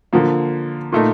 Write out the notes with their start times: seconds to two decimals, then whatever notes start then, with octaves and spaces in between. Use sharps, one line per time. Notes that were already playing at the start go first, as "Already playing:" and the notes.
0.13 D3 F3 A#3
0.92 A#2 A3 D#4